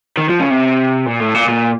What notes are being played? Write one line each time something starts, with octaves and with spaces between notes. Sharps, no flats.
D#3
F3
C#3
C3
A#2
A2
A#2
A#2